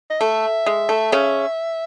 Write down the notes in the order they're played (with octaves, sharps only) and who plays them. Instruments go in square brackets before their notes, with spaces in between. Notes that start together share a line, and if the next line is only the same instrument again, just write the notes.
[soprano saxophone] D#5
[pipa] A3 [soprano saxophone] E5
[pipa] G#3
A3
C#3 C#4